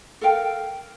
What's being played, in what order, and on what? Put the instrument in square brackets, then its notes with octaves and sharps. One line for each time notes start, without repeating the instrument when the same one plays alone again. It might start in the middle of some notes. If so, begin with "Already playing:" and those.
[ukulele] A4 A#4 F5 G5